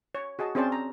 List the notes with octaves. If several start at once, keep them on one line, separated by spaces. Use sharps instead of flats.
C#5
F#4 G#4 D#5 A5
C4 C#4 G#4 C5 D5 A5
A#5